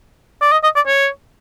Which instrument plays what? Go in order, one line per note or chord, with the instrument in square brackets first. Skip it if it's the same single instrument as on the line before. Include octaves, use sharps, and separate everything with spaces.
[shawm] D5
D#5
D#5
D5
C#5